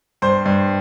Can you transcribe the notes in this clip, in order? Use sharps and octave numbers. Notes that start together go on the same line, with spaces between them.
G2 C5 C6
G2